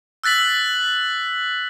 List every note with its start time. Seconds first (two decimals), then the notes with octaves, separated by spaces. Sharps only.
0.24 E6 F#6 A6 B6 F#7